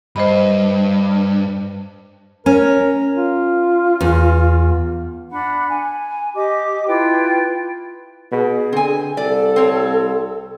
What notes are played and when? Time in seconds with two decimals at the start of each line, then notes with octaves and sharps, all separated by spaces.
0.16 G2 C5 D#5 B5
2.46 C#4 A#4
3.16 F4
4.01 E2
5.31 D4 F#5 B5
5.68 G#5
6.35 G4 D#5 D6
6.87 E4 F4 B4 G5
8.32 B2 G#4
8.73 D3 C4 G#5
9.17 C2 A4 D5
9.56 C4 C#5